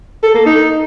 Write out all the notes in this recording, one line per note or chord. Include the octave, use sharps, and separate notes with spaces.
A4
A#3
D#4